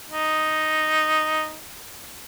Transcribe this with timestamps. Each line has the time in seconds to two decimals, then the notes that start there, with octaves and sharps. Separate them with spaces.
0.10 D#4